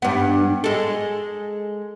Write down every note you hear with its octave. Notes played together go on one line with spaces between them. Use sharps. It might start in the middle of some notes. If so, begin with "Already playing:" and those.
G2 B3
G#3 A4